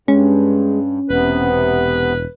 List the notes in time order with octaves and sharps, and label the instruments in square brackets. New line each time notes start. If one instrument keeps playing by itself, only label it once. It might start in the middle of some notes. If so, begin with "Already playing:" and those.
[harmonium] G2 [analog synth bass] G#3 [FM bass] C#4
[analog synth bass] E1 [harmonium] C3 B3 [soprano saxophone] B4